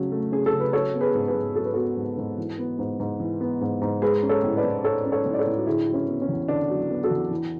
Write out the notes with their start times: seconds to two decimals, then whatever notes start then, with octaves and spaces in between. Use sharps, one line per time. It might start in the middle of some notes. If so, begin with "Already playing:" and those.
Already playing: C#3 F#3 A3 C#4
0.12 A3
0.32 C#4 G#4
0.46 A4
0.53 C#3
0.60 B4
0.73 F#3 A4 C#5
0.94 B3
1.01 G#4 B4
1.15 G#2
1.28 G#4 B4
1.35 G#2
1.55 F#3 A4
1.65 B4
1.73 B3 F#4 A4
1.97 G#2
2.17 G#2
2.38 E3
2.58 B3
2.79 G#2
3.00 G#2
3.20 E3
3.41 B3
3.61 G#2
3.82 G#2
4.02 G#3 G#4 B4
4.23 C#4
4.29 A4 C#5
4.43 A2
4.57 B4 D5
4.64 A2
4.84 G#3 A4 C#5
5.05 C#4
5.12 A4 C#5
5.26 A2
5.34 D5
5.39 A4 C#5
5.46 A2
5.57 F#4
5.66 D3 E4 G#4
5.87 F#3
5.94 C#4 E4
6.08 B3
6.22 C#4
6.28 E2
6.48 D3 D4
6.70 F#3
6.90 B3
7.04 F#4 A4
7.11 E2
7.31 E3